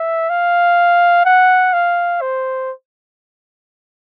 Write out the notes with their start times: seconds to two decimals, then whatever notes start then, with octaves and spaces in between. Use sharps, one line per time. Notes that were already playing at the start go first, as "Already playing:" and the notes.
Already playing: E5
0.30 F5
1.25 F#5
1.73 F5
2.21 C5